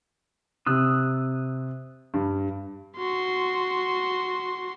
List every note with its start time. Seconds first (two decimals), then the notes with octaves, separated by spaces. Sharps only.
0.67 C3 D#6 E6 F#6
2.14 G2
2.97 F#4 C6